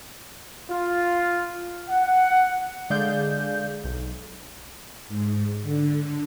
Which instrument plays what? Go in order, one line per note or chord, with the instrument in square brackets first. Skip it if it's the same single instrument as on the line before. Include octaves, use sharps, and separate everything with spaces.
[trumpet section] F4
F#5
[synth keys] D3 G#3 G#4 D5 F5 G6
B1
[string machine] G#2
D3